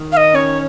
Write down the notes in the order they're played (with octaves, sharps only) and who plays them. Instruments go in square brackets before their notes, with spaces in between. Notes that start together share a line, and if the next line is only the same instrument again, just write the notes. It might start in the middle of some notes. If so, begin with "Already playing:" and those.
Already playing: [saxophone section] D#3
[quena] F5
D#5
[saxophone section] C#4 [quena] C#5